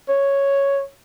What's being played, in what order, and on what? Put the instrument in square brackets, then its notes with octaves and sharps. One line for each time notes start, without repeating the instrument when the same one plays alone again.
[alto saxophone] C#5